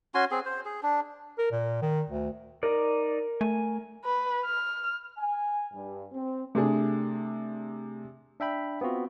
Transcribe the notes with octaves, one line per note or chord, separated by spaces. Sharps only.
C#4 F#4 G#5 C6
C4 G#4
C5
G#4
D4
A#4
A#2
D#3
D2
D#4 A#4 D5
A3 G#5
B4
F6
G#5
G2
C4
C3 A3 D4 G#4
D4 E5 G5 B5
B3 C4 F4 F#4